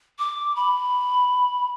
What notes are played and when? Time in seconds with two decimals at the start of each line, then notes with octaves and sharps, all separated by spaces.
0.19 D6
0.56 B5